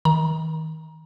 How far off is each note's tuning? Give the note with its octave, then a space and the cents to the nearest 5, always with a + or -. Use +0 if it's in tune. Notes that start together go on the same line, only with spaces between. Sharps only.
D#3 +35 A#5 +25